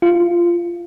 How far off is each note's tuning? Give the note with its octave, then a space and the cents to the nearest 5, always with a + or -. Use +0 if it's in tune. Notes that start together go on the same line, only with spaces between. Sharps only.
F4 -15